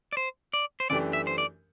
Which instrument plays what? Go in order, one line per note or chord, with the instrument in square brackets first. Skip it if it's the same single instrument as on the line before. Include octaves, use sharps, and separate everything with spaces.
[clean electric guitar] D5
C5
D5
C5
[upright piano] F#2 E3 A3 D4 G4 [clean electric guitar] D5
[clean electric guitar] E5
C5
D5